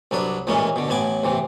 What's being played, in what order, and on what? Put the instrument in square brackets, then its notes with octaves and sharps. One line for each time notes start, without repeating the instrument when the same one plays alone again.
[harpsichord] C2 F#3 D4 B4
A1 A#2 E3 G#3 C#4 C#5
B2 D3
A1 A2 B3 G#5 D6
A1 C3 E3